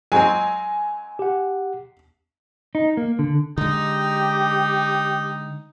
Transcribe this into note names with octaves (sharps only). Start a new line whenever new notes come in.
F#3 G#3 C4 G#5
G4 F#5
D#4
A#3
D3
D3 G#3 D#4 G4